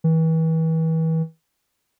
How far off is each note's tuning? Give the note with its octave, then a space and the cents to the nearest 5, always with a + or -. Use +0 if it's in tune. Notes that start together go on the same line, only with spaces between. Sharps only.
E3 -35